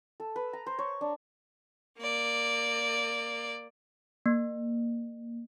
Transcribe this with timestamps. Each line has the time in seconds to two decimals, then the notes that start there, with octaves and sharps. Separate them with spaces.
0.20 A4
0.36 B4
0.53 A#5
0.66 C5
0.79 C#5
1.01 D4
1.99 A#3 D5
4.26 A#3